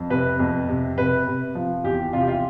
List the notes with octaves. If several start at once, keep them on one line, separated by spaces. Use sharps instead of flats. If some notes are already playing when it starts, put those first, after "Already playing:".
Already playing: F2
C3 B4
F2
C3
C3 B4
C3
F3
E2 G4
C3 F4
G4
F4